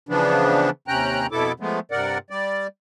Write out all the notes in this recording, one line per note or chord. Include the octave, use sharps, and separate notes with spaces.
C#3 E3 F3 B3 D4
D#2 C3 C#4 G5 A#5 F#6
F2 B2 B3 E4 A4 D6
F3 G#3 A3 B3
G2 C3 A#4 D5 F#5
G3 D5